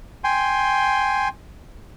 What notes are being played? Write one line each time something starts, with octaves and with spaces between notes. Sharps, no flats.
G5 G#5 C6